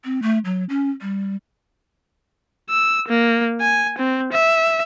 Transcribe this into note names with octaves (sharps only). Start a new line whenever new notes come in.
C4
A3
F#3
C#4
G3
E6
A#3
G#5
C4
E5